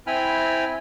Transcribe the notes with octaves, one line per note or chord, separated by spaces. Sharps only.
C4 E4 G5 G#5 B5 F6